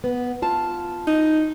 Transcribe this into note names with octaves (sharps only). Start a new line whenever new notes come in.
B3
F4 A5
D#4